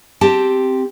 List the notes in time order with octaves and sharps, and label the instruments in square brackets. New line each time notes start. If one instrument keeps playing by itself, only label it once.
[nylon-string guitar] C4 G4 A5